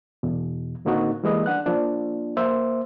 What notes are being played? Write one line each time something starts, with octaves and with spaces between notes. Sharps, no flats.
E2 B2
A2 D3 A#3 C4 D#4 F#4
E3 G3 G#3 A#3 B4 D#5
D4 F#5 F#6
F3 A#3 D4 F4
A#3 C5 E5